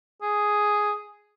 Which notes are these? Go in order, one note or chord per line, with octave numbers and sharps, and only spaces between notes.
G#4